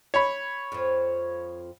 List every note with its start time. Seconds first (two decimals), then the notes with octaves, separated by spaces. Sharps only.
0.14 C#5 B5
0.72 F2 F3